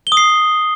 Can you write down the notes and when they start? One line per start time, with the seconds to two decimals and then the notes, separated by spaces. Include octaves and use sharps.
0.07 G7
0.12 D#6
0.17 C7